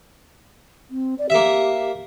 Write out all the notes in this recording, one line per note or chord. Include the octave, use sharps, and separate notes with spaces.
C4
D5
A#3 G4 E5